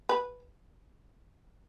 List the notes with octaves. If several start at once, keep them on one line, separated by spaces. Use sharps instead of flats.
B4